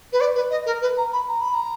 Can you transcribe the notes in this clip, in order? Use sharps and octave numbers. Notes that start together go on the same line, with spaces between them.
B4
D5
B4
D#5
A#4
B4
A#5
B5
A#5
B5
A#5